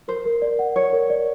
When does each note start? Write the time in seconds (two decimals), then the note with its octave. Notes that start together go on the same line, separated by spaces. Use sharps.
0.08 A#4 C5
0.25 A#4
0.42 D5
0.59 F#5
0.76 A#4 C#5
0.93 A#4
1.10 D5